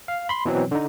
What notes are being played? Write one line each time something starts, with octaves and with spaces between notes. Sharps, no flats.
F5
B5 C6
B2 E3 F#3 C4
D3 D#4